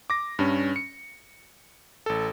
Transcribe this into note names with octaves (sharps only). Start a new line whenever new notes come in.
D6 A#6
G2 C#4
C#7
A1 A4